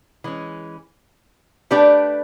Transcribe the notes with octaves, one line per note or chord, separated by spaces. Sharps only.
E3 G#3 C#4
A3 D4 G4 B4 D5